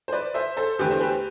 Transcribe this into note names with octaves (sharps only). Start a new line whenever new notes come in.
C5
B4 D5
C5 E5
A4 C5
E2 D3 A3 G4 B4
C5
G4 B4